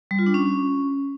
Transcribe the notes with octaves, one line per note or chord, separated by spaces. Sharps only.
G3
F4
D4
C#4